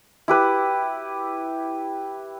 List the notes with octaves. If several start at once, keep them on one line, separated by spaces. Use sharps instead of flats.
E4 G4 B4